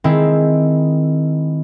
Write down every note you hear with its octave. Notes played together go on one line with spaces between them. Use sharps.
D#3 G#3 C4 E4